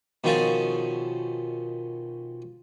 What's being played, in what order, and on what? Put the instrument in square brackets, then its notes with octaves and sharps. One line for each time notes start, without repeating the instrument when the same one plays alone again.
[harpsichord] B2 D#3 F3 C#4 G#4 A5